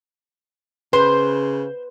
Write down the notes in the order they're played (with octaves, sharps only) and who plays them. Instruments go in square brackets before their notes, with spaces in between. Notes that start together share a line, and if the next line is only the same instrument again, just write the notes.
[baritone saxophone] C#3 [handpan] B4 [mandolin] C5